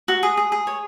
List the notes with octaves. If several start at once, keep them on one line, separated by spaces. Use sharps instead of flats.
F#4
G#4
G#4
G#4
C#5